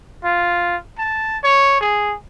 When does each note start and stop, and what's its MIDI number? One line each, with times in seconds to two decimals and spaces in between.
0.24 0.76 65
0.98 1.39 81
1.44 1.81 73
1.81 2.15 68